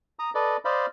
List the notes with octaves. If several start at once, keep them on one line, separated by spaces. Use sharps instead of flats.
A#5 D#6
A4 B4 D5 D#5
C5 D5 D#5 F5 B5